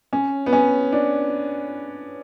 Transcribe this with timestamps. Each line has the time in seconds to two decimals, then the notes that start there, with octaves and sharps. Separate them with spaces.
0.13 C#4
0.46 B3
0.53 C#4
0.92 D4